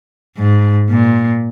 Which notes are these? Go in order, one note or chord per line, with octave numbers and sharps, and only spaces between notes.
G#2
A#2